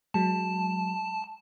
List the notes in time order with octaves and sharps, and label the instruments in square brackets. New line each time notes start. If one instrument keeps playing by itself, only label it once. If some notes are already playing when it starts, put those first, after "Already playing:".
[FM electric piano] F#3 G#3 [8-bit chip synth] A5